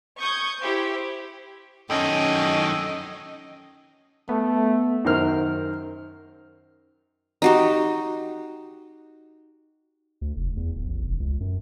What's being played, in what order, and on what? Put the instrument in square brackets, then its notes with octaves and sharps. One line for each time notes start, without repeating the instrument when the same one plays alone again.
[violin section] C#6 D#6 G6 G#6
E4 G4 C5
[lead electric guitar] F#2 D#3 [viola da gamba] C#4 [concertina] A4 G5 [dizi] D#5
[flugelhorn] A3 [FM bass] B3
[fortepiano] F#2 D#3 A#4 C5 F6
[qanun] D#4 F#4 G4
[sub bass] D2
F1
E2
D1
A1
F1
C#2
F#2